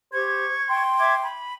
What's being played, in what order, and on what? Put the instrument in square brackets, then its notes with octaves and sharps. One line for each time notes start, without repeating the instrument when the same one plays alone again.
[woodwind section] G4 C5 [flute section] C#6 G#6
[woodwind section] G5 C6
[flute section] E5 D6 G#6
B5